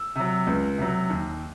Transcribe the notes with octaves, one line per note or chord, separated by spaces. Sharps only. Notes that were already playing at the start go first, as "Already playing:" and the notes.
Already playing: E6
C3 F#3
C#2
C3 F#3
D#2